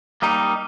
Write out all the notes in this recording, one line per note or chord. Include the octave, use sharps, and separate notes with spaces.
G3 A#3 D#4